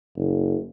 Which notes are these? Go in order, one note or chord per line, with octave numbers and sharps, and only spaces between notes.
F#1